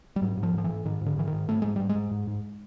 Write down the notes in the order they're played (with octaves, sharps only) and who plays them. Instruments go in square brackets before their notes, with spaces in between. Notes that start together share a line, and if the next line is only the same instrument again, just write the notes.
[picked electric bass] G3
G#2 F#3
G#2
F3
G#2 F3
E3
G#2
G#2 D#3
G#2
D3
G#2 E3
G#2 D#3
G#2 A3
G#2 G#3
G#2 G3
G#3
G#2
G#2
G#2